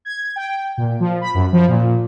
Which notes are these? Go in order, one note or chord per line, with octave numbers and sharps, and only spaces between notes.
G#6
G5
A#2
F3
B5
F#2
F3
A#2